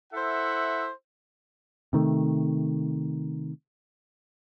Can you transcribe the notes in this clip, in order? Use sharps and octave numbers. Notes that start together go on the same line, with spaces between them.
E4 A4 C5 E5 F#5
C3 D#3 A3